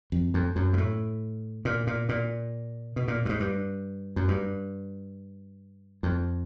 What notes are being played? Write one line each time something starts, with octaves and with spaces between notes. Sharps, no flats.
F2
F2
F#2
G#2
A2
A#2
A#2
A#2
B2
A#2
G2
G#2
G2
F#2
G2
F2